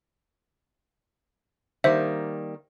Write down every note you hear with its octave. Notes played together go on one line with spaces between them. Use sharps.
D#3 G3 A#3 C5 E5